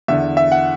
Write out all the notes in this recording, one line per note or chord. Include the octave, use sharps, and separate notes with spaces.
E2 D3 E5
E5
F#5